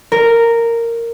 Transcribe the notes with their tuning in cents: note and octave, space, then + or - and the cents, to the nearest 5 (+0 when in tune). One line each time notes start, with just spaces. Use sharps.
A#4 -10